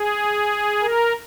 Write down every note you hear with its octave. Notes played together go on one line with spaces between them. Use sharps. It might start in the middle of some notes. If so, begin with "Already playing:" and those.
Already playing: G#4
A#4